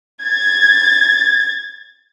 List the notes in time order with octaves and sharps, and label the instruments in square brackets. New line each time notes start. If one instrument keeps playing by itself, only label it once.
[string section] G#6 A6